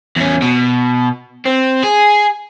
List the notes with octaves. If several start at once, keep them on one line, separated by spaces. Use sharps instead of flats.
E2 C#4
B2
C4
G#4